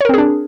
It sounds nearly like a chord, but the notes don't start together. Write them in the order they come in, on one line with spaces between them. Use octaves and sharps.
C#5 A#4 C4 G#4 D4